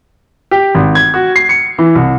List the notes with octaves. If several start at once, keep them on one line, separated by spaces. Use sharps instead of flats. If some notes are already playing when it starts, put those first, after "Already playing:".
G4
G#1
G#6
F#4
C7
C#7
E3
C2